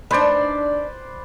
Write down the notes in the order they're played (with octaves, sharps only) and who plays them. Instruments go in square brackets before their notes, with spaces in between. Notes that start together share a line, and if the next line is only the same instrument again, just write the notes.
[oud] D4 D#4 [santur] B4 C5 D5